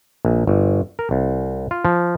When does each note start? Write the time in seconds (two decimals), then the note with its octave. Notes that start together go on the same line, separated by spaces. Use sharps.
0.25 A#1
0.47 G1
0.99 A#4
1.11 C2
1.71 F4
1.85 F3